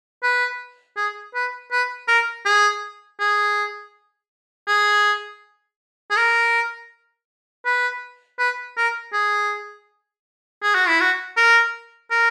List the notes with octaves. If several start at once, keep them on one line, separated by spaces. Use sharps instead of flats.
B4
G#4
B4
B4
A#4
G#4
G#4
G#4
G#4
A#4
B4
B4
A#4
G#4
G#4
F#4
E4
F#4
A#4
A#4